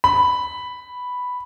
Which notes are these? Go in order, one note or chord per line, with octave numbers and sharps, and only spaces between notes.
B5